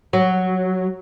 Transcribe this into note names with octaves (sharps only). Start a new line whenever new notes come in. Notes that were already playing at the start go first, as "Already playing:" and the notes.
F#3